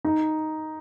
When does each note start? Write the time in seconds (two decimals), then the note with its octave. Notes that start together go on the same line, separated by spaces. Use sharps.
0.05 D#4